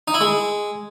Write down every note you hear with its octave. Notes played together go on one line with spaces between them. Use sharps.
D#4
E4
G#3